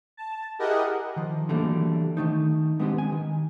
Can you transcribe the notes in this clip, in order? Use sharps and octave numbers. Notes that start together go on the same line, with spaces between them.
A5
E4 G4 G#4 A#4 D#5 F#5
D#3 F3
D3 E3 F#3 G3 A3 A#3
D#3 A3 D#4
G#3 B3 C4 D4 G4
G#5
D#3